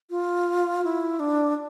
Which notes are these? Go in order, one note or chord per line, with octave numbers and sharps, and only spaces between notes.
F4
E4
D4